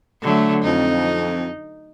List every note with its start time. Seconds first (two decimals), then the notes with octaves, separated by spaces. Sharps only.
0.22 D3 F#3 A3
0.64 F2 D#4